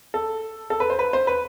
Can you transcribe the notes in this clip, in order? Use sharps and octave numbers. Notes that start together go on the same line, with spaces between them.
A4
A4
B4
C5
B4
C5
B4